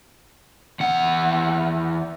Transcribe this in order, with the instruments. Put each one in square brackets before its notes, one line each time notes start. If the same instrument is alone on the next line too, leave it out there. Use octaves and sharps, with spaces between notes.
[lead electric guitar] E2 F#5